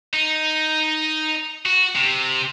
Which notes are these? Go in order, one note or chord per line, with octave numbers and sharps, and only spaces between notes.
D#4
F#4
C3